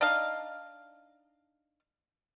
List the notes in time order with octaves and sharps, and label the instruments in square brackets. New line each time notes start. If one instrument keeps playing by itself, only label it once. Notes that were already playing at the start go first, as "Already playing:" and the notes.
[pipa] D4 D#4 D#5 F5